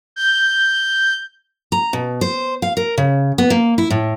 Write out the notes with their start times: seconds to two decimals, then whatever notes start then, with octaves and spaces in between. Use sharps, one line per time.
0.16 G6
1.72 A#5
1.93 B2
2.21 C5
2.62 F5
2.77 A#4
2.98 C#3
3.38 B3
3.50 A#3
3.78 E4
3.90 A2